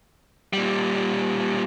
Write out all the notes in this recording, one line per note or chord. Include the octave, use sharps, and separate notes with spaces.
A#2 G3